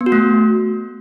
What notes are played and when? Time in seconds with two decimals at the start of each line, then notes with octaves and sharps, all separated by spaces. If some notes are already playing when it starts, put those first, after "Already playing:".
0.01 B3
0.06 F#4
0.12 A3